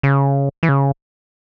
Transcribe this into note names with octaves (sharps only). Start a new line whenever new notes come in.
C#3
E3
C#3